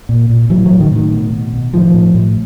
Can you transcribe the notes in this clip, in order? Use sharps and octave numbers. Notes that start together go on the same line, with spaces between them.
A#2
A#2
A2 E3 F#3
E3 F#3
A2
D#3
A2 D#3
B2
B2
B2
A2 D#3 F3
A2
A2